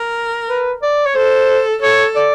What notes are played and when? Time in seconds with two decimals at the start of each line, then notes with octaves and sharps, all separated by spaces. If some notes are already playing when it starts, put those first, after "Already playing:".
Already playing: A#4
0.49 B4
0.82 D5
1.06 C#5
1.15 A4 C5
1.82 A4 C#5
2.16 D5